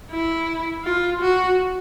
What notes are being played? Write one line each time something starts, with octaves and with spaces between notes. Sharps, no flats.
E4
F4
F#4